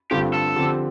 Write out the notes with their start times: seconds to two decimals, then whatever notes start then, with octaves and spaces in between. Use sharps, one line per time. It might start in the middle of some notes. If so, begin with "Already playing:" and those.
0.11 G2 D3 A3 C4 F4 G4
0.34 A4
0.56 D3 F3 C4 G4